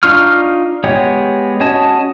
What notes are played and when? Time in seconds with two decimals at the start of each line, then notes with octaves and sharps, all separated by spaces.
0.03 D4 D#4 F4 C#6 F6
0.84 G#3 B3 G4 C#5
1.60 C#4 F#4 C#5 D#5 A5